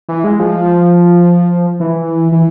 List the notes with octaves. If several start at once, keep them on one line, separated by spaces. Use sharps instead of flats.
E3
G#3
F3
E3
E3